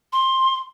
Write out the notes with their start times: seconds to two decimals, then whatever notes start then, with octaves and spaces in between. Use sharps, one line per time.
0.13 C6